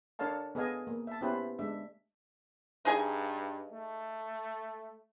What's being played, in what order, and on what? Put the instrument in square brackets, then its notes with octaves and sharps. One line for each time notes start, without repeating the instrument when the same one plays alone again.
[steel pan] D4 A4 A#4 C#5 F5 A5
B3 G#4 A4 D#5 F5 G#5
A#3
E5 A5
B3 C#4 E4 G4 B4 C5
G#3 A3 D4 E5
[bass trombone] G2 [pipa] D#4 G#4 G#5
[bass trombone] A3